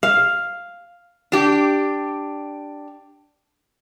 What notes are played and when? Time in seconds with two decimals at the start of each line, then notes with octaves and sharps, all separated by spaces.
0.03 F5
1.32 D4 G4